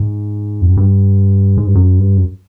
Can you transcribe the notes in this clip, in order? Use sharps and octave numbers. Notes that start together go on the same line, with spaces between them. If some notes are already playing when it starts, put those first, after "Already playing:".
Already playing: G#2
F2
F#2
G2
G#2
G2
F#2
G2
F#2